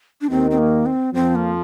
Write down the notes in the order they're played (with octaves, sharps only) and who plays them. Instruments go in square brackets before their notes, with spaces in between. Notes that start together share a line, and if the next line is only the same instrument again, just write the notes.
[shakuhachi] D4
[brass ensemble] D#2 D#3 [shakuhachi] C4
[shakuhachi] C4
A#3
C4
[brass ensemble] F2 F3 [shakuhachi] C4
[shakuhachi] A#3